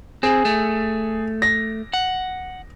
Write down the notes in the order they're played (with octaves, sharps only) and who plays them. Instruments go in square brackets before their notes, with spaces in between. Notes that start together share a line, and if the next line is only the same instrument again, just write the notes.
[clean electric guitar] C4 [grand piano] G#4
[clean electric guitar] A3
[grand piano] A#6
[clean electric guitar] F#5